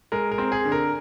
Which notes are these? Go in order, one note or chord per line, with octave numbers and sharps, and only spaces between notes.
G#3 A#4
A#4
C4
G#4
D3
A#4